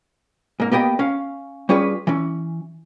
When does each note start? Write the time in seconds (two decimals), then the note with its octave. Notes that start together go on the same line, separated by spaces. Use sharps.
0.60 G#2 A#3
0.72 A#3 B3 G4 D#5 G5
0.99 C#4 F5
1.69 G3 C#4 F4 G#4 B4
2.07 E3 C#4